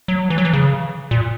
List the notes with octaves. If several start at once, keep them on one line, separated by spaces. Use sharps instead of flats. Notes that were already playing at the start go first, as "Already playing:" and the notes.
F#3
E3
F#3
E3
C#3
A#2